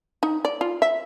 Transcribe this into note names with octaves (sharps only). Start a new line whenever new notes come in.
D#4
D5
F4
E5